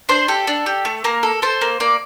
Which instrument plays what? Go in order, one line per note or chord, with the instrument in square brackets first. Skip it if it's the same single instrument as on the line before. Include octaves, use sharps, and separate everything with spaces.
[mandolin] D4 C5
G4 A4
D4
G4
A3
A#3 A#4
A4
A4 C5
A#3
A#3 D5